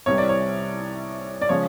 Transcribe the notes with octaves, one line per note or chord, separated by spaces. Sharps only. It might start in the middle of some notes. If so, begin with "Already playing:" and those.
C2 C3 E3 G3 C#5
D5
C#5
D5
C#3 F3 G#3 C#5